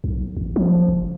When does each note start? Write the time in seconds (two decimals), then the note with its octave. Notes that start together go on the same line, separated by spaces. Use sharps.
0.04 B1
0.37 A1
0.56 F3
0.88 F#1